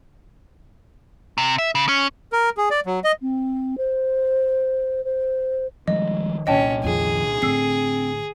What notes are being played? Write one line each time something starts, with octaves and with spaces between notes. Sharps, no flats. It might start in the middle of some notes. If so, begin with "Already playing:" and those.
C3
E5
C#3
C#4
A#4
G#4
D5
F#3
D#5
C4
C5
C5
D#3 F3 G3 G#3 D#5
C2 A#2 C#4 D#5 G5 A5
F2 D#3 G#4
A2 D3 C4 E6 C7